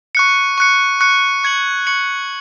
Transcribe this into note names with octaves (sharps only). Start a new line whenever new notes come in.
C#6 F#6 C#7
C#6 F#6 C#7
C#6 F#6 C#7
C#6 G#6 C#7 F#7
C#6 G#6 C#7 F#7